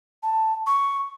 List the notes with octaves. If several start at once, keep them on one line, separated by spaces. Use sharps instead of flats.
A5
C#6